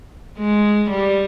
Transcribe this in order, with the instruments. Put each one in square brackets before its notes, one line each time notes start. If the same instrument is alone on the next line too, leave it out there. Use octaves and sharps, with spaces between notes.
[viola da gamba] G#3
G3